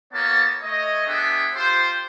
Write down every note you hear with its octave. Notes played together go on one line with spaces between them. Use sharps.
A#3 B3 F#4 C#5 A5
A3 C#5 D#5
B3 D4 G#4 E5 G5
F4 G4 C5